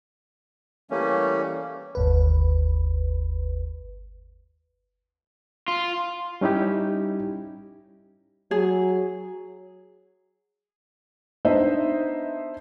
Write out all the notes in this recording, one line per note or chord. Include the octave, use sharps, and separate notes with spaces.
E3 G3 A3 A#3 C#4
G1 D#2 B4
F4
G3 C#4 D#4 E4 G4
F#3 G#4
B3 D4 D#4 C5 D#5 E5